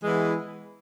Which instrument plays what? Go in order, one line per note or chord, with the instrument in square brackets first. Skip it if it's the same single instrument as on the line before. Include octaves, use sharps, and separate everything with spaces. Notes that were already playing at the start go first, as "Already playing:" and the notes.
[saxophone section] E3 G#3 B3 E4